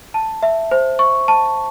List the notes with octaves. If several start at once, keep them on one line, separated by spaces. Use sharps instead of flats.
A5
E5
C5
C#6
A5